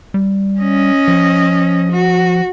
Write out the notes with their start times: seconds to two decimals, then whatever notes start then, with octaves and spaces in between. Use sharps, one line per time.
0.14 G3
0.59 C#4 D#5
1.08 F3
1.92 F#4